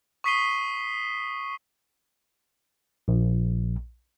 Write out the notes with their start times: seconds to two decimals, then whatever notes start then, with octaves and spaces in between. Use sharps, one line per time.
0.24 C#6 D#6 B6 C7 D#7 G7
3.08 A#1